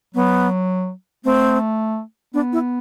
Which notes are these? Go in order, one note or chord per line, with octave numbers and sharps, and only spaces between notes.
F#3 B3
A3 C4
B3 D4
E4